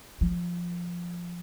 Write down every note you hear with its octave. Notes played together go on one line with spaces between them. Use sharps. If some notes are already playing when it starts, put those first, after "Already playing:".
F3